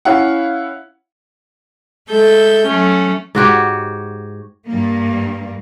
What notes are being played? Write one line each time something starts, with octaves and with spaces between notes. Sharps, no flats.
C#4 E4 F5 F#5
G#3 A4 E5 G6
F#3 A3 C#4
G#2 F#4 G4 C#5
G2 A#3